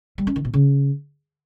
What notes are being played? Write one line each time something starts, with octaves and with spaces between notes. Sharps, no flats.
G3
C#4
D#3
B2
C#3